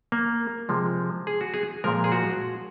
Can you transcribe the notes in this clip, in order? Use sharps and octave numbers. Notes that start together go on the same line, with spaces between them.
A#3
C3 F3 G#3
G#4
F#4
G#4
A#2 F3 G#3 A#4
G#4
F#4